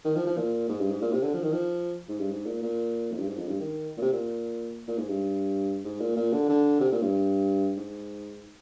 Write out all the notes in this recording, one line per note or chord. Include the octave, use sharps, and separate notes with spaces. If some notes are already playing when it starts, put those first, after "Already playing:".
D#3
F3
F3
A#2
G#2
G2
G#2
A#2
C3
D3
F3
D#3
F3
G#2
G2
G#2
A#2
A#2
F2
G2
G#2
F2
G2
D#3
A#2
C3
A#2
A#2
G#2
G2
G#2
A#2
A#2
D3
D3
C3
A#2
G2
G#2